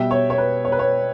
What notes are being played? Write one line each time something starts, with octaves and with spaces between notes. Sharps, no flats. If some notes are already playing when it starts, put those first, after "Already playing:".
Already playing: B2 G3 E5 G5
C#5
C#5
B4
C#5
B4
C#5